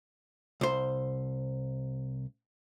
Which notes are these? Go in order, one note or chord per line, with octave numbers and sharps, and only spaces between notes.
C2 C5